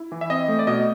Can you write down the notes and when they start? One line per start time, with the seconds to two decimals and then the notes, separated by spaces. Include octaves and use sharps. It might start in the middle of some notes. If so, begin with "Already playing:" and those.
Already playing: E4
0.12 E3
0.21 E5
0.30 C4 D#5
0.48 A3
0.59 D5
0.67 B2 D#5